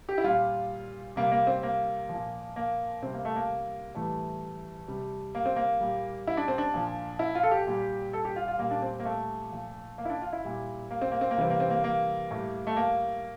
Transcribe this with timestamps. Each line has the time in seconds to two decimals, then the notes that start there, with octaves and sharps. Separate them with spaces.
0.09 G4
0.18 E4
0.24 A#2 G3 F4
1.16 C3 G3 A#3
1.32 A#3
1.47 C4
1.63 A#3
2.09 A#2 F3
2.56 A#3
3.02 C3 G3 C4
3.14 A#3
3.25 A3
3.36 A#3
3.95 A2 E3 G3 A3
4.88 C3 G3
5.35 A#3
5.46 C4
5.56 A#3
5.80 A#2 G3
6.27 E4
6.37 D4
6.48 C4
6.58 D4
6.74 A#2 F3
7.19 E4
7.35 F4
7.43 A4
7.51 G4
7.67 A#2 G3
8.13 A4
8.25 G4
8.36 F4
8.48 F4
8.59 A#2 G3 A#3
8.71 D4
8.82 C4
9.00 A#3
9.05 A3
9.52 A#2 F3
9.98 A#3
10.05 E4
10.10 D4
10.22 F4
10.33 E4
10.45 A#2 G3
10.91 A#3
11.01 C4
11.12 A#3
11.21 C4
11.31 A#3
11.38 C3 E3 G3 C4
11.50 A#3
11.60 C4
11.70 A#3
11.84 A#3
12.31 A2 G3
12.67 A3
12.76 A#3